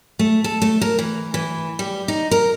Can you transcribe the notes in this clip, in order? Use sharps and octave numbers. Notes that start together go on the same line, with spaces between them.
A3
A4
A3
A#4
E3
E3
G3
D#4
A#4